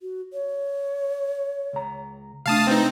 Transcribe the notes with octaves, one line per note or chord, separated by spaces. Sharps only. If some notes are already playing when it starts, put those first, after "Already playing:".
F#4
C#5
C#2 A#5
C3 A3 D4 F5 A5 D#6
C4 D#4 B4